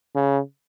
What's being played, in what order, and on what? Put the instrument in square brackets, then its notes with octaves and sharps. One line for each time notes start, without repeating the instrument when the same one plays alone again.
[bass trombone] C#3